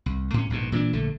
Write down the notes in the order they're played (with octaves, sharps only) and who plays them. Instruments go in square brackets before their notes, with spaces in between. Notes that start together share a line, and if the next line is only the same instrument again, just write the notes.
[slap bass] C2
A2 C#4
A#1 G#2 B2
A#2 E3 A#3 D4
A#1 D3 A3